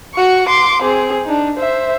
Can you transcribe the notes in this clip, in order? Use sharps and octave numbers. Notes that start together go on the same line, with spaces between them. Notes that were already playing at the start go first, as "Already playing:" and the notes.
F#4 C#6
C6 D6
C4 G#4
D4 D#4
C5 E5